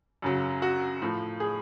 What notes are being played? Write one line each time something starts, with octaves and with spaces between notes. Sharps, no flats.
F#2 C#3 F#3
F#4
A2 F3
G#4